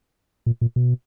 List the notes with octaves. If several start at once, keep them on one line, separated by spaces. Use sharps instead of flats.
A#2
A#2
B2